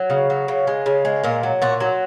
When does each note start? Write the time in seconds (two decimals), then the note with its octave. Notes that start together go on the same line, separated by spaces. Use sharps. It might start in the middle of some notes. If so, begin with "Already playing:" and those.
Already playing: F#3
0.10 C#3
0.30 F#3
0.48 C#3
0.67 G#3
0.86 C#3
1.05 G#3
1.24 A#2 A#4
1.43 F#3
1.62 A#2 F#4
1.80 F#3